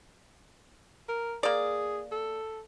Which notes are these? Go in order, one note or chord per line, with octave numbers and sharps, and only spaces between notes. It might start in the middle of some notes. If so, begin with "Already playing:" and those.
A#4
A#3 G#4 D5
A4